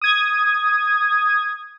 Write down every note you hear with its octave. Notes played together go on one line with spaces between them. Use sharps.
D#6 G#6